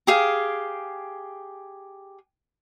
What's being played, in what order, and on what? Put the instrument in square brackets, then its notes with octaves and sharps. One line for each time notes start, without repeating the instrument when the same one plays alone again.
[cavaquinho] G4 G#4 F5